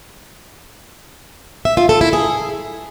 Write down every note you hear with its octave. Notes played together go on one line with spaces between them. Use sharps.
E5
F4
A4
E4
G#4